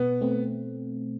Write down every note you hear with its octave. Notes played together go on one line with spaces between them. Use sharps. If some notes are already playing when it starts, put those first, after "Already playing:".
Already playing: B2 B3
A3 C4